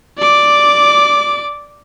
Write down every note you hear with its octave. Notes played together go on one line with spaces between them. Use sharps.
D5 D6